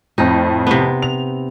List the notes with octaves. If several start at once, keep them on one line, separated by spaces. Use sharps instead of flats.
F2 A2 D#4
C3 B3
F7